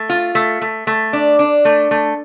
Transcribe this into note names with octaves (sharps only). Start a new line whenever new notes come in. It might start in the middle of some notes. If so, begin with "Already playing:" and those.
Already playing: A3
F4
A3
A3
A3
D4
D4
A3
A3